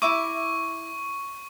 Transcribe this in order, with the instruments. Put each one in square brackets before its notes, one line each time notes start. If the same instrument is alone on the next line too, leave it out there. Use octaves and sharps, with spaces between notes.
[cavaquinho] E4 E5 D6 [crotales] C#6